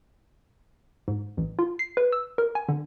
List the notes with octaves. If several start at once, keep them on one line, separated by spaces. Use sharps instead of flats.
G#2
A1
F4
C7
B4
E6
A#4
G#5
D3